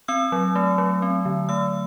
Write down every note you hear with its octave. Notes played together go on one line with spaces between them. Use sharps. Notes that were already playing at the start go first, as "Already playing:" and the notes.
C4 E6
F#3
A3
F#3
C4
D3
A3 E6